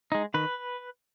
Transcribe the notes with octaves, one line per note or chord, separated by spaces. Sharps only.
G#3 D#4
D#3 B4